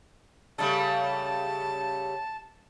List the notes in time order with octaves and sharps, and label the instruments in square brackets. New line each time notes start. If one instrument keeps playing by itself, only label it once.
[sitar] C#3 G3 A3 [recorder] A5